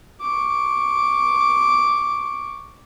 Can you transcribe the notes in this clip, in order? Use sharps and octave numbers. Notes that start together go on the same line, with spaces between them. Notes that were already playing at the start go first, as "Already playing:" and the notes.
C#6 D6